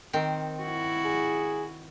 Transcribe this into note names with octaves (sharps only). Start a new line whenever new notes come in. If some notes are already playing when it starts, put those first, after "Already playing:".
D#3 C4
E4 F#4
G#4